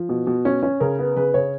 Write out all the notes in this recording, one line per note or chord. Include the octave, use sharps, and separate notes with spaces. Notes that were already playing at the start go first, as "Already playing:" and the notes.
Already playing: F3
B2
B2
C#4
C#4
C#3 A#4
B3
C#3 B4
C#3 C#5